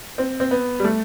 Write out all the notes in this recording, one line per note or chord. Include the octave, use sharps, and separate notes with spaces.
C4
C4
B3
G3
A3